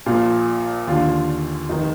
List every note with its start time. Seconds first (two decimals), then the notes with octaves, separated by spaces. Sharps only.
0.06 A#1 A#2 F4
0.87 D#2 D3 F4
1.69 F1 D#3 D#4